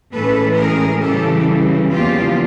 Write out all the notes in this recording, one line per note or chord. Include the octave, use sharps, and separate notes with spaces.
A2 E3 G#3 C#4 A4 B4
G#4 A#4
C#3 E3 G3 G4 A4
E2 C#3 F3 A#3 F4 G4